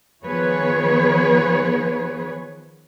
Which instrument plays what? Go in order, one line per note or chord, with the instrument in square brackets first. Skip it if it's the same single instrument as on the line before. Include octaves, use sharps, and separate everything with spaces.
[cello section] D#3 F3 B3 G#4 B4 C#5